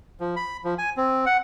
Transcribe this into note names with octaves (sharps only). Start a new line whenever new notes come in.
F3
B5
F3
G#5
C4
F#5